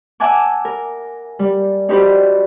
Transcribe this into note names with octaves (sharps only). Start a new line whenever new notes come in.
E5 F#5 G#5 A5 D6
A#4
G3
D4 D#4 F#4 G4 B4 C5